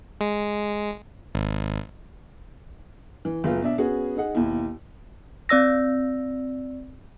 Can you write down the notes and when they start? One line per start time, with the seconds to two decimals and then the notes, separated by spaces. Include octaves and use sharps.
0.21 G#3
1.35 G#1
3.25 E3
3.44 F#1 B3 F4
3.62 B2 D4 E5
3.78 B3 C#4 F#4 G#4
4.17 D#4 G#4 F#5
4.35 D#2 B2 E4
5.49 C4 D5 E6 A#6